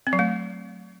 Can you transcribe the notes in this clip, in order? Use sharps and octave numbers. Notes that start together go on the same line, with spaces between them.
C4
F#3
A3